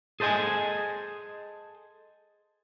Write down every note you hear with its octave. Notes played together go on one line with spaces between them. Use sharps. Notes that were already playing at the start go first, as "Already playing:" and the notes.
G#4 A4 C5 D#5 G#5